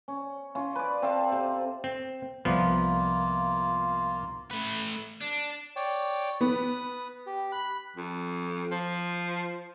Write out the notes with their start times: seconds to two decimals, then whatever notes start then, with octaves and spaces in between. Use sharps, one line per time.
0.08 C#4
0.55 C#4 F4
0.75 B4 D5
1.02 C4 A4 F5 A5
1.32 C3
1.84 C4
2.45 C2 F3 A#3 B3 F4
4.51 A3 B4
5.21 D4
5.76 C#5 D5 G5
6.41 B3 B4 D#6
7.27 G4
7.52 B5 F#6
7.96 F2
8.71 F3